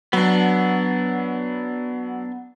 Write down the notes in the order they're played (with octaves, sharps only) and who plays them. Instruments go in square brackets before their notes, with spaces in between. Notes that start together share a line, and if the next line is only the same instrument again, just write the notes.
[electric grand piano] F#3 [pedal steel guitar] B3 D4